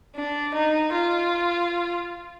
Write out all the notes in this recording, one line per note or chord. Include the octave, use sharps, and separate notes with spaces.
D4
D#4
F4